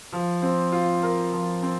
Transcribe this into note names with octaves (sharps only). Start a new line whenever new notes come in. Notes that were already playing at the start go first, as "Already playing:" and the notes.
F3
C4
F4
A#4
F3
C4